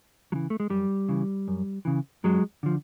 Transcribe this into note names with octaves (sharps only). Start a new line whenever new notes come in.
C#3 E3 F#3
A3
G#3
F#2 G3
C#3 E3
F#2
C#3 E3
F#2 F#3 G#3
D3 F3